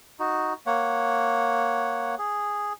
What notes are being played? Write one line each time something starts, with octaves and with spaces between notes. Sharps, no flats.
D#4 F#4
A#3 C#5 F#5
G#4